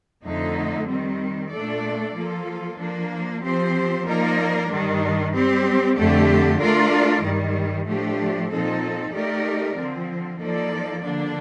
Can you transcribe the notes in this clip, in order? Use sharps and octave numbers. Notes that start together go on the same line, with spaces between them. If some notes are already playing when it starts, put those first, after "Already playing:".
F2 D3 A3 D#4
D#3 G3 C4
A#2 A3 D4 A4 D5
F3 A#3 F4 A4
F3 A#3 D4
F3 C4 G4 C5
F3 A#3 D#4 A#4 D5
G2 D#3 G3 D4
G3 C4 G4
F2 D3 A3 D4 G4
A3 D4 F4 A#4 D5
G2 D#3 G3
A2 F3 A3 D4 G4
A#2 F3 C4 D#4 A4
A3 D#4 G4 A#4 D5
D3 F3 C4
F3 A#3 D#4 A4 D5
D3 F3 A#3 D4